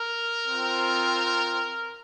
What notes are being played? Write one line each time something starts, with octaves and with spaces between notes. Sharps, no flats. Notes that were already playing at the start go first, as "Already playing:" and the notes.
Already playing: A#4
C4 F4